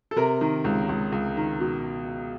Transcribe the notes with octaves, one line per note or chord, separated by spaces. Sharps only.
A4
C3 A#4
D#3
C#2
C#2
C#2
D#3
B2